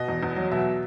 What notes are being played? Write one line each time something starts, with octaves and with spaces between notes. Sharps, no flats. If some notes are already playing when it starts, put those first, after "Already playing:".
Already playing: B2 D#5
E2
E2
F#3
B2 E5